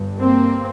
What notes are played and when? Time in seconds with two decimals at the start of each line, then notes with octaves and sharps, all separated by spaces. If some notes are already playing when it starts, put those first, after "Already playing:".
Already playing: G1 G2
0.20 A#3 C4